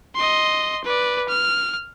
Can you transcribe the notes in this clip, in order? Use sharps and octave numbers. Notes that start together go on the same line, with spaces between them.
D#5 C6
B4 D5
F6